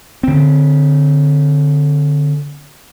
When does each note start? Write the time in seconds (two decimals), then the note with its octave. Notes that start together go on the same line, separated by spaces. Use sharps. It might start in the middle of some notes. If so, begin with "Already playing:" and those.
0.23 D3 C4